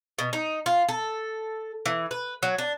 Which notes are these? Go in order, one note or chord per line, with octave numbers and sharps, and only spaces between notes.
B2
D#4
F4
A4
E3
B4
F#3
D4